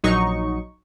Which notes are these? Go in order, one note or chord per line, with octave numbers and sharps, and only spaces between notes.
A#1 F#3 D#4 C#6